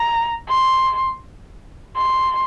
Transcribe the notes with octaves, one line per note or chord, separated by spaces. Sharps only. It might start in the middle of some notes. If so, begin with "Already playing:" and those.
Already playing: A#5
C6
C6